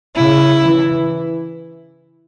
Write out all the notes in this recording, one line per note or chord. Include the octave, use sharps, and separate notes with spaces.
C#3 E4
E3